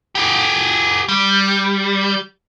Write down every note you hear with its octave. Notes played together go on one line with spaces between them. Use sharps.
G4 G#4
G3